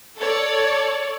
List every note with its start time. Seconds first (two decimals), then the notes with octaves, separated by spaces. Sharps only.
0.18 A4 C#5 D5